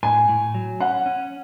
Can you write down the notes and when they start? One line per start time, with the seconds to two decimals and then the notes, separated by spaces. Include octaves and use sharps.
0.03 A2 G#5
0.29 A2
0.54 F#3
0.80 C#4 F#5
1.06 C#4